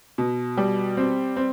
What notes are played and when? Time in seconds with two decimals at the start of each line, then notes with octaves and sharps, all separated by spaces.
0.18 B2
0.57 G3
0.97 C4
1.36 C4